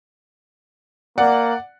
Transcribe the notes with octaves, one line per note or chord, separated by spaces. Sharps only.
A#3 D5 F#5